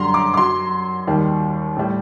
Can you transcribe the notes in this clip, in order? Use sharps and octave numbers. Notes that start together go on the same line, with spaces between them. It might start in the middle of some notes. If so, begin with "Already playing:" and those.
Already playing: F#2 D3 G3 A#5 C6
D6
D6
F#2 F#3 C6
D#2 D#3 G3
A2 G3